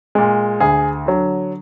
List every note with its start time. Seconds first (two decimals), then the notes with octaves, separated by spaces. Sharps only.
0.15 A#2 G#3
0.60 D2 G#4
1.06 D3 F#3